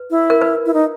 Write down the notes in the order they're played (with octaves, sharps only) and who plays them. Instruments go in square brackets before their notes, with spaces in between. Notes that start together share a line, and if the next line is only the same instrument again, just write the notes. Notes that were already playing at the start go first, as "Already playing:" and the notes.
Already playing: [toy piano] B4
[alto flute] E4
[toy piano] A#4
B4
[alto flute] E4
D#4